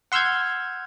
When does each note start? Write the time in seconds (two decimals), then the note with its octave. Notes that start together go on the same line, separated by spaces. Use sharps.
0.12 F#5 C6 E6 F6 G6 G#6